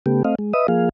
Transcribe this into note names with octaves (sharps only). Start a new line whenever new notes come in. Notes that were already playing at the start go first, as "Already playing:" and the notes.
C#3 A3 B3 G4
A3 C4 D#5 F5
G#3
B4 D#5 E5 D#6
F3 A#3 G#4 F5